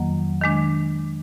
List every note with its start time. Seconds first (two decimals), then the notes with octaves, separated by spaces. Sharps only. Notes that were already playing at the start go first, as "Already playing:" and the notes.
Already playing: F2 D#3 F#3 A#3
0.42 D#3 G#3 D4